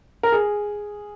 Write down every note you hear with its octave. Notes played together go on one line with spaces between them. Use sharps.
A#4
G#4